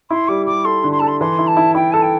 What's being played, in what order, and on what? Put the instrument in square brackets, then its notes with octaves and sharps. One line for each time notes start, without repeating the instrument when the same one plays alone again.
[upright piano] E4 [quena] C6
[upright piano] G3 [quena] D6
[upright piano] G3 [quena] D6
[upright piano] A4 [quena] C6
[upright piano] D3
[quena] C6
[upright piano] A4 [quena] A5
[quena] C6
[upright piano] E3 [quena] C6
[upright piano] E4
[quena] A5
[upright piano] E4
[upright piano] E4 [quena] G5
[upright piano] A4 [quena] A5
[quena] G5